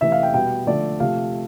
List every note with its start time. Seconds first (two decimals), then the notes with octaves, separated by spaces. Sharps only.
0.01 C3 E3 A3 E5
0.12 F5
0.23 G5
0.34 B2 G3 B3 G5
0.67 D3 F3 A3 D5
1.00 C3 F3 A3 F5